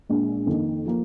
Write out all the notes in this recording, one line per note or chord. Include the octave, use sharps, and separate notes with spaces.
A#1 A#2 G#3
F2 D#3 A#3 D#4
F3 A#3